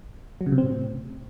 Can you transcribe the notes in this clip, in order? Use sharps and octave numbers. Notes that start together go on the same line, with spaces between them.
F#3
C#3
C3
C4
A2